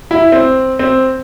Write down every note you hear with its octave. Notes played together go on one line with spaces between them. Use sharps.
E4
C4
C4